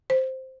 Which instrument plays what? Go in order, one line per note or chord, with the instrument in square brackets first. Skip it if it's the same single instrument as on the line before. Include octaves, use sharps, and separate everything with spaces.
[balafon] C5